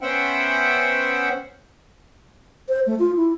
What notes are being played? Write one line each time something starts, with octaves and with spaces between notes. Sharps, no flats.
B3 C#4 C5 E5 F#5 G5
C5
A3
F4
E4